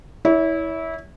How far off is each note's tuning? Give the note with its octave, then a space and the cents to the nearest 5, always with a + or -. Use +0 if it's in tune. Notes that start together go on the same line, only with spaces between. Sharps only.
E4 -20 C#5 +30